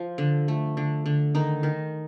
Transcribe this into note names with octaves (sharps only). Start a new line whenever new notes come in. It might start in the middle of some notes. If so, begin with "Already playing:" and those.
Already playing: F3
D3
A3
D3
D3
D#3 D#4
D#3